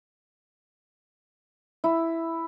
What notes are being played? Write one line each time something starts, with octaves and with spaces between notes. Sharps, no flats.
E4